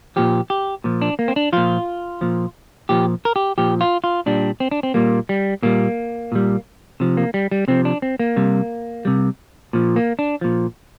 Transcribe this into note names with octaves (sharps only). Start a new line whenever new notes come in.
A#2 F3 G4
G4
A#2 F3
D4
A#3
C4
D4
A#2 F3 F4
A#2 F3
A#2 F3 G4
A#4
G4
A#2 F3 G4
F4
F4
A#2 G3 D4
C4
D4
C4
A#2 G3 A#3
G3
A#2 G3 A#3
A#2 G3
C3 F3
A#3
G3
G3
C3 F3 C4
D4
C4
A#3
C3 G3
C3 G3
A#2 F3
A#3
D4
A#2 F3